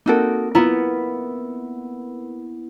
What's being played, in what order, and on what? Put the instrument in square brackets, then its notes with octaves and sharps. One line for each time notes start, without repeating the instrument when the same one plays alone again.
[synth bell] A#3 C4 A#4 [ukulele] D#4 F#4 A4
[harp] B3 E4 [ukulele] F4 A#5